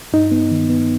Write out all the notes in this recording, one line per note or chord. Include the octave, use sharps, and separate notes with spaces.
G2 D#4
B3
D#3
B3